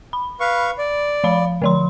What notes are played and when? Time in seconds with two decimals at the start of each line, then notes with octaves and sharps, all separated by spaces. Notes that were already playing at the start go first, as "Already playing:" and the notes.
0.13 B5
0.40 B4 F5 C#6
0.78 D5
1.24 F3 F5 B5
1.62 D3 F3 C6